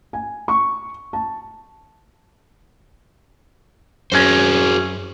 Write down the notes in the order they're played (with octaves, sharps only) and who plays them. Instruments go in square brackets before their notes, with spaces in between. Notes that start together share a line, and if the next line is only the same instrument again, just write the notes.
[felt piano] G#5
C#6
A5
[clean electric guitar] F#2 C#4 [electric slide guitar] F#4 G#4 C5